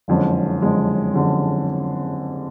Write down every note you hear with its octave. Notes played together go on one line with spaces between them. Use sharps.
F#1 F2 D3 G#3 C#4
F#1 F2 D3 G#3 C#4
F#1 F2 D3 G#3 C#4